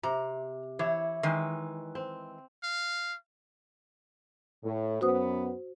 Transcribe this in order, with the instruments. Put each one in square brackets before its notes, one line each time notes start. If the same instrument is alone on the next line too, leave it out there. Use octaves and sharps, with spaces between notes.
[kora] C3 [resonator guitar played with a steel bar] A#5
[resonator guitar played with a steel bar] E3 [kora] E4 C#5
[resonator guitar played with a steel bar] D#3 E3 G#3
[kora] C4
[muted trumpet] F5
[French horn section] A2
[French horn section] F#2 B3 [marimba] F#4 C5 D#6